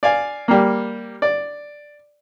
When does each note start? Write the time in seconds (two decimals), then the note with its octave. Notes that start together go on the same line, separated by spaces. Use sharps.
0.03 D5 F5 G#5
0.48 G3 A#3
1.22 D5